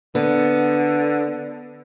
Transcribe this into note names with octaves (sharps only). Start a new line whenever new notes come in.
D3 B3